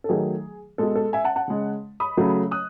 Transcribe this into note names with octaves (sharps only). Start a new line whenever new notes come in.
A4
D#3 F#3 A3 G#4
B2 G#3 A4
A4
E5 G#5
F#5 A5
F#5 A5
C#3 G#3
B5 D#6
C#3 F#3 A3
D#6 F#6